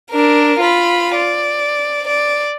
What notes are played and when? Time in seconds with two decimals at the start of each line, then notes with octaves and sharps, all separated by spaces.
0.11 D4 A#4
0.60 F4 B5
1.16 D5
2.07 D5